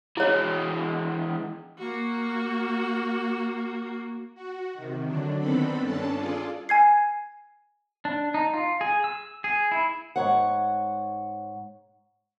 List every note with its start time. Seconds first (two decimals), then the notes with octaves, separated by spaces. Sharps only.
0.17 E3 G#3 E4 C#5
1.78 A#3 F#4
4.35 F#4
4.74 C3 D#3
5.06 D3 F#3 D4
5.40 D#3 B3 C4 D4 A4 B5
5.82 G2 C#4 D4 A4 A5
6.14 F4 G#4 A4 D5
6.69 G#5 G#6 C7
8.05 D4
8.34 D#4
8.54 F4
8.81 G#4
9.04 E6
9.44 G#4
9.72 E4
10.16 G#2 C#5 F#5